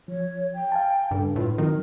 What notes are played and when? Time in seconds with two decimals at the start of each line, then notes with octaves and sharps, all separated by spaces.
0.08 F3 C#5
0.54 G5
0.72 F5 G#5 A5
1.11 G2 C#3 G3 A4
1.36 A2 F4 B4
1.58 D#3 F#3 C4 D#4 A#4